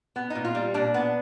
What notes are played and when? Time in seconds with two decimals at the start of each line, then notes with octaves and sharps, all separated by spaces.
0.16 B3
0.30 D#4
0.35 A#2
0.45 F4
0.55 G3
0.74 A#2 D4
0.94 B3